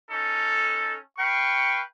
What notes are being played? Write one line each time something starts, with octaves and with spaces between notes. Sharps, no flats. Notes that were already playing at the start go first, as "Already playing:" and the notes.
C#4 D#4 A4
B4 F5 G5 C#6